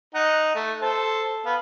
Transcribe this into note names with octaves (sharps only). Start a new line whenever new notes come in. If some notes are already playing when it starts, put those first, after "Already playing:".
D#4 F#5
A3
A4 C5 A5
B3 F5